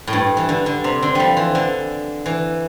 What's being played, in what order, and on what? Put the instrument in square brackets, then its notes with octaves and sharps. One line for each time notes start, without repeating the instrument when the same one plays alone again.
[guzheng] A2
G2
E3
D3
D3
C3
D3
F3 G3
E3
D3
E3